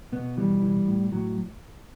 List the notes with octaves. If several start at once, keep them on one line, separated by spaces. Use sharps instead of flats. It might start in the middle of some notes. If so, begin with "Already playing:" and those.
B2 B3
E3 G3
E3
A2
A2 F#3